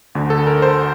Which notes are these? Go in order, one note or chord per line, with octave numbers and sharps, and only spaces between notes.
D2 D3
A4
A#4
C5